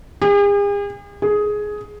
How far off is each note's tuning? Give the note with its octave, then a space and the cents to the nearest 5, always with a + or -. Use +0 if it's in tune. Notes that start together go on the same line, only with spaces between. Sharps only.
G#4 -45
G#4 +10